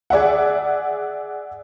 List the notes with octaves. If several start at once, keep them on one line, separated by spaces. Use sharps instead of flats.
G#4 D5 E5 F#5